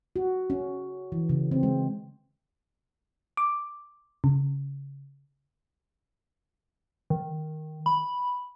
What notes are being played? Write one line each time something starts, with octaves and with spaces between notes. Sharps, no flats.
F#4
C#4
E3
C#3
C4
G#3
D6
C#3
D#3
B5